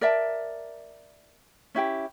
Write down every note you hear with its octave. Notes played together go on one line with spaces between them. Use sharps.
A#4 D5 E5 A5
C#4 E4 G4 G5